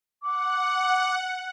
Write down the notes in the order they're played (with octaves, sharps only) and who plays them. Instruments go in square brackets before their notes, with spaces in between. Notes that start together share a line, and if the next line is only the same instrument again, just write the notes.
[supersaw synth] F#5 [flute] D6